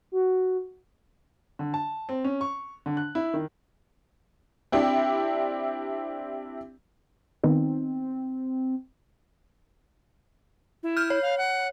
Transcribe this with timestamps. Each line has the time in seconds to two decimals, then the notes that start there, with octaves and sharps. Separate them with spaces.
0.12 F#4
1.59 D3
1.74 A5
2.09 C4
2.24 C#4
2.41 C#6
2.86 D3
2.97 F#6
3.15 E4
3.34 D#3
4.72 C4 D4 E4 G4
7.43 D#3 B3 C4 D#4
10.83 E4
10.97 F6 G6
11.10 C#5
11.22 F5
11.38 F#5